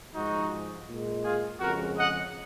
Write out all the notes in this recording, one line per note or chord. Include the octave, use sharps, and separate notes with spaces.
G#2 F3 G#3 D#4 F#4
A#2 G#3
F4 G#4
F2 C#3 G#3 F#4 A#4
D#5 F#5